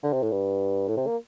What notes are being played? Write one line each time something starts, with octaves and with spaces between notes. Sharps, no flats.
D3
C3
A2
G2
A2
C3
A#3